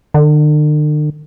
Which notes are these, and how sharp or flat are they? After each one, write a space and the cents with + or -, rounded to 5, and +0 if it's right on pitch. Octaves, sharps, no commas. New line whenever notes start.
D3 +45